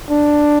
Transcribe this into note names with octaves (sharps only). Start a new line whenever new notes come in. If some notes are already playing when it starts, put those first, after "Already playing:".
D4